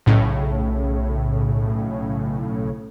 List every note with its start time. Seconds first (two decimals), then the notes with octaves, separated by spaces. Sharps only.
0.06 B1 A2 C#3